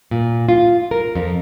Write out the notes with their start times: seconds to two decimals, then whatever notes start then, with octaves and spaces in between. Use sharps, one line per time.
0.11 A#2
0.49 F4
0.91 A#4
1.15 F2